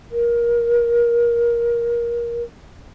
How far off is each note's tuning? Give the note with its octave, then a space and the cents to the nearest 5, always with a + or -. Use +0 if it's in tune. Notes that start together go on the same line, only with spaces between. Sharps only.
A#4 +20